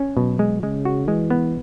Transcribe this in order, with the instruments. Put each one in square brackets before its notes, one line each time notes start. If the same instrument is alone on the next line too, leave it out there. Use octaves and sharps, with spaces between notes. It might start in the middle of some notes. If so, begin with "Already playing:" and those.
Already playing: [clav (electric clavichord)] C#4
[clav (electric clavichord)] B2 [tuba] F#3
[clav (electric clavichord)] G#3
[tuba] C#3 [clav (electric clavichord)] G#3
[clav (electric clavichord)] F#4
[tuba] E3 [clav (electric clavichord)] G#3
[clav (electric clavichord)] B3